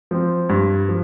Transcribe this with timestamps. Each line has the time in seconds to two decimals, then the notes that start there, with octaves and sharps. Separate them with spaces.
0.11 F3 C4
0.49 G2
0.89 F3